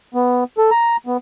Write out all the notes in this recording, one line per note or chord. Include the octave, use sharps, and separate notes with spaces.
B3
A4
A#5
B3